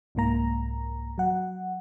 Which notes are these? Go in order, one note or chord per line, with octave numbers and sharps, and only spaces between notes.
C2 G#2 A#3 A#5
F#3 F#5